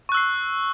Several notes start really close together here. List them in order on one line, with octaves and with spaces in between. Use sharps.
C#6 F#6 E6 C7